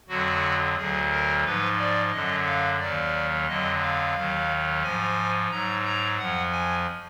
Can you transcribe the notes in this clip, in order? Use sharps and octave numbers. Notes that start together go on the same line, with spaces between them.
F2 D3 F#3 F#4
D2 D3 F#3 G#4
A#4
G#2 F3 B4
D5
F#2 D3 F#3 D#5
F5
D#2 D#3 F#3 D5
F2 D3 F#3 D#5
F5
D#2 D#3 F#3
G#2 F3 G#5
G#2 F#3 A#5
A#5
F2 F3 F#5
G#5